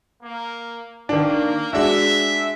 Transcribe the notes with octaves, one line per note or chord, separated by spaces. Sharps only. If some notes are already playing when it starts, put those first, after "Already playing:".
A#3
D#3 A#3 D4
G#3 D4 F#4 E5